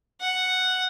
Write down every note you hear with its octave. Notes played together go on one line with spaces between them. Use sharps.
F#5